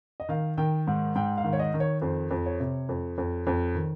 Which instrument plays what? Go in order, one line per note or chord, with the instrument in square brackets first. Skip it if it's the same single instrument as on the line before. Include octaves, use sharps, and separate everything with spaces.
[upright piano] D#5
D#3 F5
D#3 G5
G#2
G#2 G5
F5
D#3
C#5
D#5
D#3
C#5
F2 C5
F2
C#5
C3
F2
F2
F2
D#3